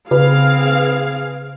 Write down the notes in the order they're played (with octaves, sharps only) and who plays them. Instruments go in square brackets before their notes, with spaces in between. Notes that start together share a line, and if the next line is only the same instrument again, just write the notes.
[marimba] C#3 [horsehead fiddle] C4 G#4 [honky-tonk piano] B4 [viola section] F5